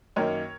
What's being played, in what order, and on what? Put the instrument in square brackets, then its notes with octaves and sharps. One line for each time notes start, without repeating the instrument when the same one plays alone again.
[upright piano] F#2 D#3 A#3 D#4 A#4 C#5